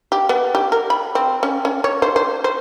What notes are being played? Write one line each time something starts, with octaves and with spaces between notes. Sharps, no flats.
G4
B3
G4
A#4
B5
C4
C#4
C#4
C#5
C5
C5
C5